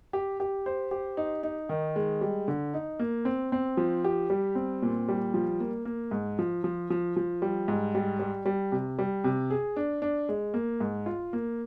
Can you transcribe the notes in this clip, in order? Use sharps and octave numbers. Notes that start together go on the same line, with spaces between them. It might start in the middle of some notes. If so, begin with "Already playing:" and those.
G4
G4
C5
G4
D#4
D#4
D#3
G#3
G3
D3
D#4
A#3
C4
C4
F3
G4
G3
C4
A#2
G3
F3
A#3
A#3
G#2
F3
F3
F3
F3
G3
G#2
G3
G3
G3
C3
G3
C3
G#4
D4
D4
G#3
A#3
G#2
F4
A#3